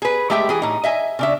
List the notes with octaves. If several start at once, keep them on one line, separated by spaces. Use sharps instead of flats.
G#4 B4
G#3 A3 G4 E5 G5
E3 G#4
A2 D#4
D#5 E5 G#5
C#3 D4 E5